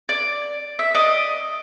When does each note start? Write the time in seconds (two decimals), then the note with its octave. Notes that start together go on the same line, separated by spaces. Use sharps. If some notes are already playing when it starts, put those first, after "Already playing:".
0.09 D5
0.79 E5
0.95 D5 D#5